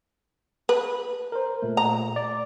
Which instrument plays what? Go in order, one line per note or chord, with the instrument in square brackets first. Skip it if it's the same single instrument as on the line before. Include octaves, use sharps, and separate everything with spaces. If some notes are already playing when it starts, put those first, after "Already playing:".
[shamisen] B4
[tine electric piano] A#4 C5
A#2 A3
[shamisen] A#5
[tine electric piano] D5